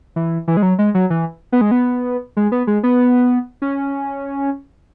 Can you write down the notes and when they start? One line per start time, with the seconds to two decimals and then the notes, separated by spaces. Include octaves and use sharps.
0.16 E3
0.47 E3
0.57 G#3
0.62 F#3
0.79 G#3
0.94 F#3
1.10 E3
1.52 B3
1.61 G#3
1.71 B3
2.37 G#3
2.52 B3
2.67 G#3
2.83 B3
3.62 C#4